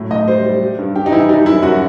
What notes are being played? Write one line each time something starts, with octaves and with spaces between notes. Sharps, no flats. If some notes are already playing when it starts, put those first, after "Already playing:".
Already playing: A2 F#3
A2 D#5
G3 C5
G3
G3
G2
G2 G4
D#4
E3 E4
G3 D#4
F#2 E4
F#2 F#4